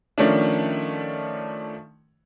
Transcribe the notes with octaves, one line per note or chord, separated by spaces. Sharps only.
D#3 F3 A3 C#4 D4